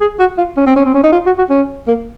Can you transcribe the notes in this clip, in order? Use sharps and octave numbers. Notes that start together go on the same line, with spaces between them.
G#4
F#4
F4
C#4
C4
C#4
C4
C#4
D#4
F4
F#4
F#4
C#4
A#3